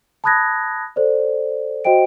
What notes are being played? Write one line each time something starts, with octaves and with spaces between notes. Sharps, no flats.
A5 B5 D#6 F#6 G#6 A#6
A4 C5 D5
F#4 C5 D#5 G5 D7